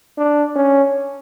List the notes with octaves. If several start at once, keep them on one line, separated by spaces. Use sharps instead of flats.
D4
C#4